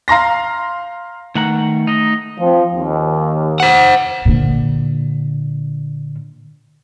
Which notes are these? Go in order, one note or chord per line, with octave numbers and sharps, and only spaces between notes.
F5 A#5 C6 A#6
D#3 A3 F#5 A#5
D#4 D#5
F3 C4
D#2
C5 F#5
A#2 D3